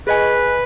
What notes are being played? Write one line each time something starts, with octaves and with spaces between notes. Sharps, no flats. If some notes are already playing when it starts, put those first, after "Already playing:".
G#4 B4 D#5 G#5